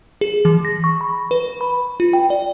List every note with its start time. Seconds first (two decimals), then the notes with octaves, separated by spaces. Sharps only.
0.21 G#4
0.45 E3
0.65 A#6
0.84 C#6
1.01 B5
1.31 B4
1.61 B5
2.00 F4
2.13 G5
2.30 D5